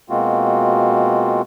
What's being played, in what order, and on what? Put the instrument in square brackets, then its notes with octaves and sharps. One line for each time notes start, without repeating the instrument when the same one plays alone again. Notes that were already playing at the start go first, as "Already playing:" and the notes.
[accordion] B2 G#3 A#3 C4 F4 F#4